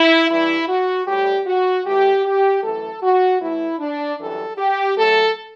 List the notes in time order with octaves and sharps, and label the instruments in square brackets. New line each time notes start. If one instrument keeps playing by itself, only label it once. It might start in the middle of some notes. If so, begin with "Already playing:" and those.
Already playing: [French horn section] E4
G2 E3 G3 E4
F#4
A2 G3 G4
F#4
A2 E3 A3 G4
G4
F#2 E3 A3 A4
F#4
A2 E3 A3 E4
D4
F#2 E3 G3 A4
G4
F#2 F#3 A3 A4